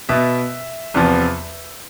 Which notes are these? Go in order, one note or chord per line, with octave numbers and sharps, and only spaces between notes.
B2 B3 E5
E2 C3 F3 B3